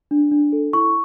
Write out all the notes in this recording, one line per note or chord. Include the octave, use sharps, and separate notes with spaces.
D4
D4
A4
E4 C#6